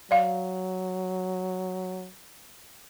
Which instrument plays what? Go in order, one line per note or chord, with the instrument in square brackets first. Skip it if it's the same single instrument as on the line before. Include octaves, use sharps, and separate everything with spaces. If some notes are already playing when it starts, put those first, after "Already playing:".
[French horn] F#3 [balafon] D5 F5